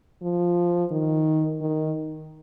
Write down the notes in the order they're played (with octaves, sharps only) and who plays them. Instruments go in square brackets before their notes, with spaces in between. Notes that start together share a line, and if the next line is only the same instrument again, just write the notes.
[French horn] F3
D#3
D#3